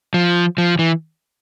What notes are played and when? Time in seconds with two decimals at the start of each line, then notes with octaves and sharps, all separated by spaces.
0.14 F3
0.58 F3
0.79 E3